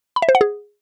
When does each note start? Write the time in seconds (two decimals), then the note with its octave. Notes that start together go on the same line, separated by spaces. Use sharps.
0.16 B5
0.22 E5
0.29 C5
0.35 F#5
0.41 G#4